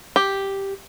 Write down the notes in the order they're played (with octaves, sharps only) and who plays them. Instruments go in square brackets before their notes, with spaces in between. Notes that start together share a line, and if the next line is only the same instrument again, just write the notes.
[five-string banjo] G4